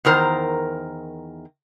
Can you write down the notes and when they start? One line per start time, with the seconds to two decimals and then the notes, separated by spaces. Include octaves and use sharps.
0.05 E2 D#3 A#4 C5 A#5